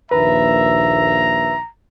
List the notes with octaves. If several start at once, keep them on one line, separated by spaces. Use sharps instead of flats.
A#1 D#2 B4 E5 A#5